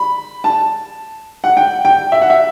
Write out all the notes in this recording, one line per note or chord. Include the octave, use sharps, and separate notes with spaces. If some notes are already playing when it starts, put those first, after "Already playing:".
Already playing: B5
A5
F#5
G5
G5
E5
F#5
E5